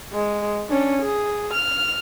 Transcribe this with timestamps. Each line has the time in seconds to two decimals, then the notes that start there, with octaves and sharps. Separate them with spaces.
0.13 G#3
0.69 C#4 D4
1.02 G#4
1.53 F6